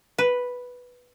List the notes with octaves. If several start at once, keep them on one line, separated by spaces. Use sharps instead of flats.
B4